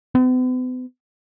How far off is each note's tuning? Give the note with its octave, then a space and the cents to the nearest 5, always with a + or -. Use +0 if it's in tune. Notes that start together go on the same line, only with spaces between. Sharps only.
B3 +45